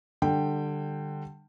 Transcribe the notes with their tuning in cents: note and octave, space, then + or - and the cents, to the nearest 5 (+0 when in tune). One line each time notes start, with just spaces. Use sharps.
D3 +20 G3 +10 G5 +0